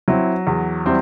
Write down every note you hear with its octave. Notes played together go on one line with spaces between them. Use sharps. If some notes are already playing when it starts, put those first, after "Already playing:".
F#3 C4 E4
E2
G3 C4 E4